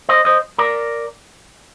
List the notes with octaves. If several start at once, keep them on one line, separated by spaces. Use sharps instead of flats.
C5 D#5
C5 D#5
A#4 D5